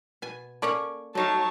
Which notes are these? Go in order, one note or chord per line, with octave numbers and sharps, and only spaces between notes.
B2 G#5
A#3 C#4 A4 C#5 D5 C#6
F#3 A3 D#4 C#5 F5 A5